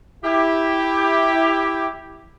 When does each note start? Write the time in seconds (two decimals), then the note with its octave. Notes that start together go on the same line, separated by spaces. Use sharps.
0.24 E4 G4